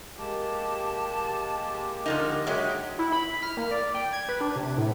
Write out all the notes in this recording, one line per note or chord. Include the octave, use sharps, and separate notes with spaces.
G#3 A#3 G4 A5
D3 F3 D#4 A#4
F#3 G#3 C#5 E5 G5
E4
B5
F6
A#3
D5
G5
G#6
B4
D4
C3
A2